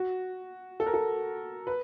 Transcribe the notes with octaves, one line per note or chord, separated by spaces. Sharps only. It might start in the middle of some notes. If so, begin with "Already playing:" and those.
Already playing: F#4
A4
A#4
A4
B4